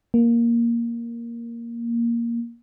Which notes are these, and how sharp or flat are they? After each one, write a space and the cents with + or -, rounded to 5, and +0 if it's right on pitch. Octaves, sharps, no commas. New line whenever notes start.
A#3 +5